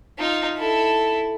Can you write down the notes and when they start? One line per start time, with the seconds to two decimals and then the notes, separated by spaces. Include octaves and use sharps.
0.18 D#4 F4
0.57 E4 A4